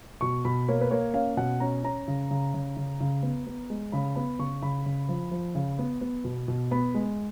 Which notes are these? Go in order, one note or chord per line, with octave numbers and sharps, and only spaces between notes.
B2 C#6
B2 B5
A#3 C#5
B4
A#3 C#5
C#4 F5
B2 F#5
C#4 A#5
C#4 A#5
C#3
C#3
C#3
C#3
C#3
B3
B3
G#3
C#3 B5
B3 B5
C#3 C#6
C#3 B5
C#3
F3
F3
C#3
B3
B3
B2
B2
B3 B5
G#3